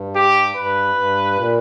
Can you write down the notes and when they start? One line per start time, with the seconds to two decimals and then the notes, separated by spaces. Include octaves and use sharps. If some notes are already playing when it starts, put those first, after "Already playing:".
Already playing: G2
0.15 G4
0.55 G2 B4
0.95 G2
1.36 A#2